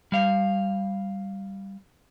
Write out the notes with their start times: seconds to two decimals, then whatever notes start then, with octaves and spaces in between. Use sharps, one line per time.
0.12 G3 F5